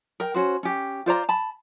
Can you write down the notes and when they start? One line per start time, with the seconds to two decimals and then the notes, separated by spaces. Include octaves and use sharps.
0.20 A#4 G5
0.34 C#4 F#4 C5
0.63 C#4 G4
1.06 F4 C5 D5 A#5
1.29 A5 B5